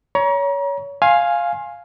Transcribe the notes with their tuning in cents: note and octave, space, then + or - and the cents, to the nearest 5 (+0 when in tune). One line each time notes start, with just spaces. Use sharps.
C#5 +25 A#5 +35
F5 +0 G#5 +0 C6 +35